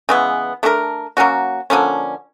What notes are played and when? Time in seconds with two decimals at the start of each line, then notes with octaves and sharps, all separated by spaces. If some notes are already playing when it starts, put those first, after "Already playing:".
0.09 C#3 E3 G#3 B3
0.63 A3 D4 G4 A#4
1.17 F#3 A#3 C#4 F#4
1.70 D3 F3 A#3 C#4